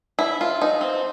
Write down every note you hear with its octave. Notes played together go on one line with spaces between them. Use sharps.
E4
F4
D#4
C4